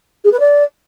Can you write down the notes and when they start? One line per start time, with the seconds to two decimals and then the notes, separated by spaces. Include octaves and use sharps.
0.24 G#4
0.32 B4
0.39 D5